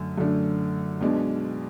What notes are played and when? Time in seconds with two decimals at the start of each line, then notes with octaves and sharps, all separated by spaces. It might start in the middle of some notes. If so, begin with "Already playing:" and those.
Already playing: F#2 D3 A3
0.18 F#2 D3 A3 D4
1.01 B1 B2 G#3 D4